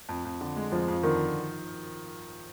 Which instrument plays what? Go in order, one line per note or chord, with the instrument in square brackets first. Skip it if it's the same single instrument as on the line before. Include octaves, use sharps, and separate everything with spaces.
[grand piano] F2
F2
D3
G#3
[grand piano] F2 [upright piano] F3
[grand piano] F2
[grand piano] D3 [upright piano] D#3